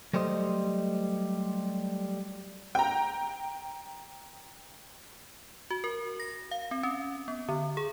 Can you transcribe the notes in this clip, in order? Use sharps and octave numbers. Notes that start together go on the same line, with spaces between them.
F#3 G3 A3 C5 D#5
G5 A#5
F#4
A#4
A#6
F5
C4
C#4
B3
D3
G#4